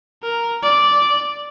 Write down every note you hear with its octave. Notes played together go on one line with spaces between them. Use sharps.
A#4
D5